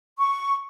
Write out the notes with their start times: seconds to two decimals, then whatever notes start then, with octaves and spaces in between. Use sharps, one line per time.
0.19 C#6